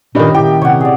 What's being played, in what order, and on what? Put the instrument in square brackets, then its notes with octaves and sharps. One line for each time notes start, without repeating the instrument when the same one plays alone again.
[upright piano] G2 D#3 [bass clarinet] A#2 [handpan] C#4 G4 D#5
[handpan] A#2 E4 [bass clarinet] D#3 [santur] G4 [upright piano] G5
[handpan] C3 [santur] C#5 F#5
[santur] G#4 D5